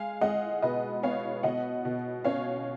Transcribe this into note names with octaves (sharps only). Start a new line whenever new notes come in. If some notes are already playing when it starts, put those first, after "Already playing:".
Already playing: G#3 F5 G#5
G#3 D#5 F#5
B2 B4 D#5
B3 C#5 F5
B2 D#5 F#5
B2
C#4 C#5 F5